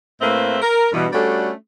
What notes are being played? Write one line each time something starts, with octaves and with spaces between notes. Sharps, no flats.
A2 A3 A#3 C4 B4 E5
A#4
G2 B2 E3
G3 A3 C#4 D4 F#4 A4